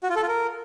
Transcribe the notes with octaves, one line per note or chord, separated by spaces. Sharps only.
F#4
F4
A4
F4
A#4